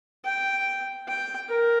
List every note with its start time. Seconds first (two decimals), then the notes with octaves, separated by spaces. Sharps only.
0.25 G5
1.08 G5
1.49 A#4